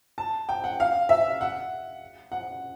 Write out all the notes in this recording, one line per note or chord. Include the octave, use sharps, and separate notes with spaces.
A5
G5
F#5
F5
E5
F#5
F#5